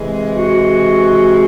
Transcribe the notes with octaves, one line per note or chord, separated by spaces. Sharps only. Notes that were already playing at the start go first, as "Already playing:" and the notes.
Already playing: C3 E3 G#3
F#4